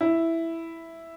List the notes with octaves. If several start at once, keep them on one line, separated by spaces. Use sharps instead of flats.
E4